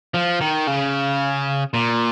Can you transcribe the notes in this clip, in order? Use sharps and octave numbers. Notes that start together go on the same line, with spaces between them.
F3
D#3
C#3
A#2